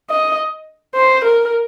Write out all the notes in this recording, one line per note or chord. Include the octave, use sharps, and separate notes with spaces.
D#5
C5
A#4